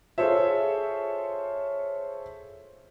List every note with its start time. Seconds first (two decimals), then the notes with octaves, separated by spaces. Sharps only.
0.18 F4 G#4 A4 C5 C#5 E5